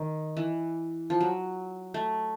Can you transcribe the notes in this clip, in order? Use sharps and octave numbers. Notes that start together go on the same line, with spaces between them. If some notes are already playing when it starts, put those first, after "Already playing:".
Already playing: D#3
E3
F3
F#3
A3